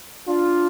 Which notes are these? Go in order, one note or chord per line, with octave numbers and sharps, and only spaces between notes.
D4 F4